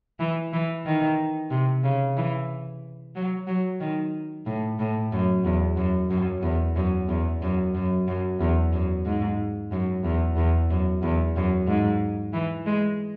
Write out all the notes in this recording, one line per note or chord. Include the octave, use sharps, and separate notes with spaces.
E3
E3
D#3
C3
C#3
E3
F#3
F#3
D#3
A2
A2
F#2
E2
F#2
F#2
E2
F#2
E2
F#2
F#2
F#2
E2
F#2
G#2
F#2
E2
E2
F#2
E2
F#2
G#2
E3
G#3